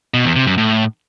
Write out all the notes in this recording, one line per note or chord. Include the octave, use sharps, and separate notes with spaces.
B2
E2
C3
F#2
A2